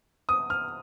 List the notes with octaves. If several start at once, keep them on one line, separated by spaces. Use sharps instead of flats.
D#6
F6